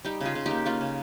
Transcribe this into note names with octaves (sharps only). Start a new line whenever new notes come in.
G3 D#4 G4
C#3 F4 G#4
C#3
A#3 D#4 G4
A#3 C#4 F4
C#3